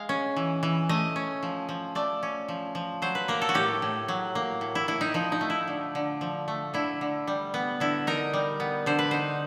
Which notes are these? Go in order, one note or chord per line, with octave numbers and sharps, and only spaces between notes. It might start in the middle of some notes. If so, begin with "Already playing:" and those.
Already playing: G#3 F5
C#4
E3
E3
A3 D#5
C#4
F3
F3
A3 D5
C#4
F3
F3
F#3 C5
B4
A#3 A#4
A4
F#4
A2 G4
A2
F#3
A#3
A2
E4
A2 E4
D#4
F3 D#4
D#4
A3
E4
D3
D3
F3
A3
D3 E4
D3
G3
B3
D3 E4
D#4 A#4
G3
B3
D3 C5
B4
D#4 C5